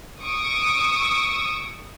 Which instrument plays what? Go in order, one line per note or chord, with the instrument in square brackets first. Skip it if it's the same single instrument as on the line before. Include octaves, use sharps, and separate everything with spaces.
[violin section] C#6 D#6 E6 D7